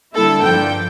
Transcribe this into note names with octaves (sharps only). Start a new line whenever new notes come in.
D3 G3 A#3 E4 A4
G2 F3 A#3 D4 G5